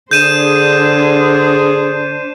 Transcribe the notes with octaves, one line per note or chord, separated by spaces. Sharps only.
D3 D4 G#4 C5 G6 D#7 E7